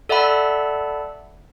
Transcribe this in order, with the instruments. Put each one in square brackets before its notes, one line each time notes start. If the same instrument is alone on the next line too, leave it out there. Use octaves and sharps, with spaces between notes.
[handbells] A4 D5 E5 F#5 A5 B5